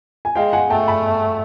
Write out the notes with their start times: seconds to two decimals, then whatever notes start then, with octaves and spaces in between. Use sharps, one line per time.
0.25 G#5
0.35 G#3 F5 G5
0.53 F#5 G#5
0.70 A3 G5 A5
0.88 A5 B5